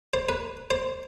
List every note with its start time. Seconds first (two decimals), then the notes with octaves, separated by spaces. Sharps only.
0.14 C5
0.29 B4
0.70 C5